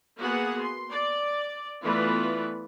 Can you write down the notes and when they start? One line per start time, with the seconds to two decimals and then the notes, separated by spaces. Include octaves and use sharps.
0.19 A#3 B3 F#4 G#4 F#5
0.59 C6
0.92 D5
1.81 E3 A3 B3 F4 B4 D5